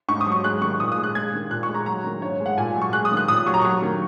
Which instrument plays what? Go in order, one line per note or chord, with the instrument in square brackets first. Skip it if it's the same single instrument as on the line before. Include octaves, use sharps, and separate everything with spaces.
[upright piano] G#2 C#6
D#6
F#3
C#6
G#3 F#6
D#3 C#6
A#2 D#6
D#6
G#3
F#6
G#3 G#6
D#3
A#2 F#6
C#6
G#3
A#5
F#3 A#5
D#3
G#2 C#5
G#3
F#5
A#2 G#5
F#3
C#6
G#3 F#6
D#6
D#3
F#6
A#2 D#6
F#3 C#6
A#5
F#3 C#6
D#3